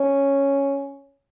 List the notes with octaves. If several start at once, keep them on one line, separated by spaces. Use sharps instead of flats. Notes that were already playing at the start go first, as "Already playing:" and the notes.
Already playing: C#4